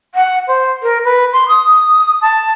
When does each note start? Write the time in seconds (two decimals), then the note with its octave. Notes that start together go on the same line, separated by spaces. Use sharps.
0.15 F#5
0.47 C5
0.83 A#4
1.05 B4
1.33 C6
1.48 D#6
2.22 A5